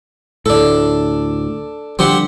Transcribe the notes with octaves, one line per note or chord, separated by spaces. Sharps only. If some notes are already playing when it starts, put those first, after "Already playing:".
D2 A2 D4 A4
D3 F3 G3 C4 G4 F#5